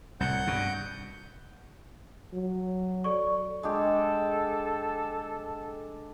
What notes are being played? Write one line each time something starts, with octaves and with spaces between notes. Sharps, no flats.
C2 A2 F#5 G6
G2 B2
F#3
A4 D5 C#6
G#3 D4 G4 A4